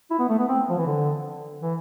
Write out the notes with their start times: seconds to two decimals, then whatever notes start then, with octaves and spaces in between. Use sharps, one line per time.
0.11 E4
0.19 B3
0.29 A3
0.39 B3
0.49 C4
0.70 F3
0.78 E3
0.86 D3
1.62 E3